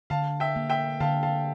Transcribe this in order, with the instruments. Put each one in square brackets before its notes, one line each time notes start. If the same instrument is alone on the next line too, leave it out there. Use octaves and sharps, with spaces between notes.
[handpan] D3 [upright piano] F5 A5
[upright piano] E5 G5
[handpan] A#3
[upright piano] E5 G5
[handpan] D3 [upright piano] F5 A5
[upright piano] F5 A5